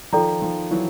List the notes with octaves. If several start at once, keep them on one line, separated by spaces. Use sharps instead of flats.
D#3 F3 F4 A4 D5 G5 A#5
D#3 F3
E3 F#3